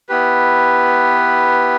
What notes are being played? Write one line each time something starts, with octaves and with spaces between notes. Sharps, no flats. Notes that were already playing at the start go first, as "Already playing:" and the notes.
B3 E4 G4 B4